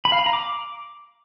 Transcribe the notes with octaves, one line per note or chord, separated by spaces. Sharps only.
B5
F5
B5
A#5
D6